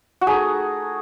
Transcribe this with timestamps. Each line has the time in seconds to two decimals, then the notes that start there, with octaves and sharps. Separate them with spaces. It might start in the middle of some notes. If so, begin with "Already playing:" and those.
0.21 F#4
0.27 A3 D#4 G#4